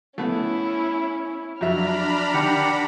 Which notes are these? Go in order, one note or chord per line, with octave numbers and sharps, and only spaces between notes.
A3 B3 C#4 E4
F2 F#3 D4 E5 A#5 B5 F6
D#3 G4 F#5